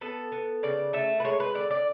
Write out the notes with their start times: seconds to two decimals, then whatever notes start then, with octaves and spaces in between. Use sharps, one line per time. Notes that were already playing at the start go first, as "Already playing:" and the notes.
0.01 B3 A4
0.32 B3
0.63 C#3 D5
0.93 A3 E5
1.20 B4
1.25 G#3 C#5
1.40 B4
1.55 D3 D5
1.71 D5